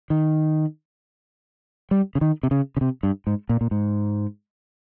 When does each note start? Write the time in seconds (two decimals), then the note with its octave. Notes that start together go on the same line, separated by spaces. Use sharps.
0.10 D#3
1.91 G3
2.15 C#3
2.21 D#3
2.43 C3
2.51 C#3
2.77 C#3
2.81 C3
3.03 G2
3.27 G#2
3.49 A#2
3.61 A#2
3.71 G#2